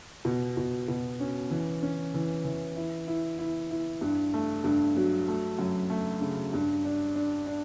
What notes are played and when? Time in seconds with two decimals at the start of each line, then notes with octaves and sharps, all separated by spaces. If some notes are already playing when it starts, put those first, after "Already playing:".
0.25 B2
0.57 B2
0.88 B2
1.20 C#4
1.51 E3
1.83 C#4
2.14 E3
2.45 E3
2.76 E4
3.08 E4
3.39 E4
3.71 E4
4.01 G2
4.34 A3
4.64 G2
4.96 F#3
5.28 A3
5.59 F#2
5.90 A3
6.21 C#3
6.53 G2
6.85 D4
7.16 D4
7.46 D4